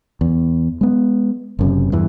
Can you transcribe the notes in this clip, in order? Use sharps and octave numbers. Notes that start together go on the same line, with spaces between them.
E2
G#3 B3
F#1 F#2 C3
E2 G2 E3